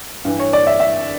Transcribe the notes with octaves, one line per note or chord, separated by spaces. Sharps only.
G2 E3
C#5
D5
E5
E5